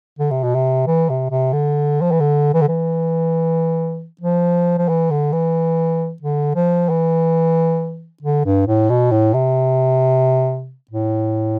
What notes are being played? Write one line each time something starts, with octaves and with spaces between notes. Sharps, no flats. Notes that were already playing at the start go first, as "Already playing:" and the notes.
D3
C3
B2
C3
E3
C3
C3
D3
F3
E3
D3
E3
D3
E3
F3
F3
E3
D3
E3
D3
F3
E3
D3
G2
A2
B2
A2
C3
A2